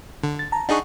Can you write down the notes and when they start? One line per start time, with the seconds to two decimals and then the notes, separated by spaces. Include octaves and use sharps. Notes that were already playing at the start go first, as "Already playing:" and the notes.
0.24 D3
0.39 A6
0.52 A5 A#5
0.69 D4 D#4 G#4 F#5 C#6